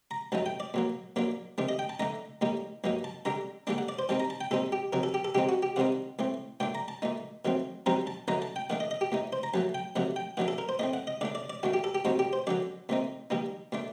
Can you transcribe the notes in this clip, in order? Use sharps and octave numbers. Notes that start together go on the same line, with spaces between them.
A#5
G2 F#3 A3 D#4 A5
G5
D5
A#2 F#3 A#3
A#2 F#3 A#3 D4
C3 D#3 A3 D4
D#5
G5
A5
D3 A3 D#4 A#5
A2 G3 A#3 D#4
G2 F#3 A#3 D#4
A5
D3 G3 D4 A#5
D3 G3 A#3 D4 A5
F#5
D5
C5
D#3 G3 C4 D#4 A5
A#5
A5
G5
A#2 G3 C4 D#4 A4
G4
C3 D#3 F#3 A#4
A4
G4
A4
D3 G3 C4 D#4 G4
F#4
G4
C3 D#3 G3 C4 D#4 F#5
A2 A3 C4
A#2 A3 D4 G5
A#5
A5
A#2 A3 D#4
D#3 F#3 A3 C4
F#2 D#3 G3 C4 D#4 A#5
A5
F#2 D3 F#3 A3 D#4 A#5
A5
G5
D#3 A3 D4 F#5
D#5
D#5
G4
A2 A3 D#4
C5
A#5
F#2 F#3 A3 A5
G5
C3 D#3 F#3 A3 F#5
G5
D#3 F#3 A3 D4 F#5
A4
A#4
C5
A2 A3 C4 D#5
F#5
D#5
D3 A3 D4 D5
D5
D5
D#3 A3 D4 F#4
G4
A4
G4
A2 G3 C4 D#4 F#4
G4
C5
F#2 D3 F#3 D5
A#2 A3 C4 D#4
D#3 G3 A#3 D#4
A#2 A3 D4